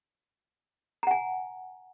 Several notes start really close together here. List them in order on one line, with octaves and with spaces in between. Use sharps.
A#5 F#5 G#5